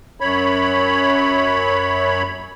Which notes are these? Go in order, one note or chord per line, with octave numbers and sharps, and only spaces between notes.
F#2 C#5 B5